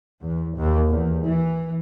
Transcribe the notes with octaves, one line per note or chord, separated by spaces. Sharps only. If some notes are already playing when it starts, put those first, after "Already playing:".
E2
D#2
E2
E3